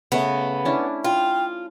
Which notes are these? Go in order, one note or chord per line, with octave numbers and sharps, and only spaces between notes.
C#3 A3 B3
C#4 D4 E4
F4 G5